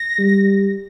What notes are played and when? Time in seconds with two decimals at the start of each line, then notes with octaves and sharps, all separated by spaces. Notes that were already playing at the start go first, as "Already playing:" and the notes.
Already playing: A#6
0.18 G3